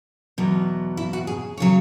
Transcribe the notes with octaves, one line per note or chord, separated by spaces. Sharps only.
E2 B2 F#3
E4
F#4
G#4
C#3 F#3 C#5